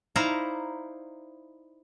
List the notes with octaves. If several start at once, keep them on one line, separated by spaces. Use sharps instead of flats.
D#4 E4 C5 D5 F5 A#5